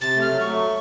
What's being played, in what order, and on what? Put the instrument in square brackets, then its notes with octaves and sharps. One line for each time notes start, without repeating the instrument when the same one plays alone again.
[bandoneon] C3 [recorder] A6
[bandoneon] A3
[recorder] F6
[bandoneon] F#3
[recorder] C#6
[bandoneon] A3